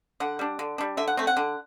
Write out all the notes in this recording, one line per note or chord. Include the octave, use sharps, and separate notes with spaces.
D3 F#5
G3 D4
D3
G3 D4
D3 E5
F#5
A3 C4
F#5
D3